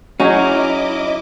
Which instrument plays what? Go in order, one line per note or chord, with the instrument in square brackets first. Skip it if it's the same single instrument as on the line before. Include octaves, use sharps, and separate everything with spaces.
[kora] F#3 D#4 G#4 [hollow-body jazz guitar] C#4 [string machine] E4 D#5 D6